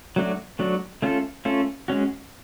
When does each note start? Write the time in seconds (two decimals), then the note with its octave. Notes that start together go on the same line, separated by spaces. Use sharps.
0.16 F#3 A3 D4 F#4
0.59 F#3 A3 D4 F#4
1.02 A3 C#4 F4 A4
1.45 A3 C#4 F4 A4
1.88 G#3 C#4 F#4